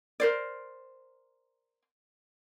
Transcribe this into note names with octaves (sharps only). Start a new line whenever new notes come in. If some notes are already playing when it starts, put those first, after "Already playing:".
A#4 C5 D5